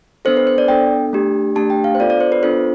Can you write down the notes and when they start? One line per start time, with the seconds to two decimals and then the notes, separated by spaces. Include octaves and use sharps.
0.25 B3 D4 A4 C5
0.37 B4
0.47 C5
0.58 D5
0.68 B3 D4 A4 G5
1.13 A3 D4 G4
1.55 A3 D4 G4 A5
1.70 G5
1.84 F5
1.95 C5
1.99 B3 D4 F4 A4 D5
2.10 D5
2.20 C5
2.32 B4
2.43 B3 D4 F4 A4 C5